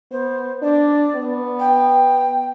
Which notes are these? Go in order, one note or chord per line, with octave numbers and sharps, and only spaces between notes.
B3 C5
D4 D5
B3
G5